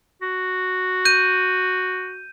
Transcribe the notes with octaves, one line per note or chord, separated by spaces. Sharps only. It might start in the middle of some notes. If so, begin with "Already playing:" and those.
F#4
G6 D#7